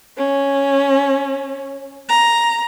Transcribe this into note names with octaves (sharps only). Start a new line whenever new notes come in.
C#4
A#5